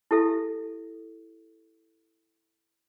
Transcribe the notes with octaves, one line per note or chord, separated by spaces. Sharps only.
E4 G4 A4 E5